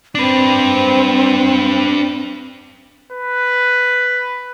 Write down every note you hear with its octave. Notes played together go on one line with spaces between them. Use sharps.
C4 D4 B4
B4